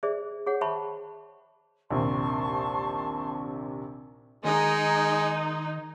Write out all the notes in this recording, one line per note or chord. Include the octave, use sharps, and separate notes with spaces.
G#4 C5 D5 E5
G#4 C#5 F#5
C5 E5 G5 A5 B5 C#6
A#1 D#2 C3 A5 C6 C#6
D#3 G#3 D#4